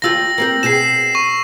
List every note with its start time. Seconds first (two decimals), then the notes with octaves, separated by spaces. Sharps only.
0.02 D#2 F4 G4 E6 A#6
0.38 A#3 C4 G4
0.63 B2 G4 G#4 C7 E7
1.15 C#6